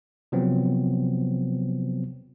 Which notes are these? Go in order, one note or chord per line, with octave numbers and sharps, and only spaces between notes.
C3 F3 F#3 B3 C4